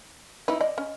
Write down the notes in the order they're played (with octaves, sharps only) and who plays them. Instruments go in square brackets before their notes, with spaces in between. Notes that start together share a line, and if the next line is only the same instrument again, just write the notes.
[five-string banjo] D#4 E4 [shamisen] B4
[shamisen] D5 [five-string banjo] D#5
[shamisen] C#4